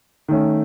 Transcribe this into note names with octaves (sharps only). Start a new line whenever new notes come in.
D#3 A3 C#4